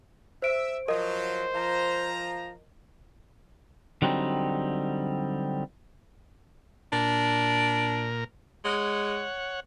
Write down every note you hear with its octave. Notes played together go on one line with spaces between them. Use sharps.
C5 E5 D7
F3 F#3 A#4 C5 D#5
F3 A#5
D3 F#3 G3 C4 D#4
A#2 D4 A#4
G#3 C#5 F#5